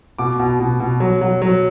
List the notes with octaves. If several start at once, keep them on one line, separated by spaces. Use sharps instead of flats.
B2 D6
B2
B2
B2
F#3
F#3
F#3